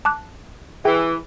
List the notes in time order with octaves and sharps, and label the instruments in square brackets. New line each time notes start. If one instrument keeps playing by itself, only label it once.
[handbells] A5 D6 F#6
[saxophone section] E3 [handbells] G#4 G5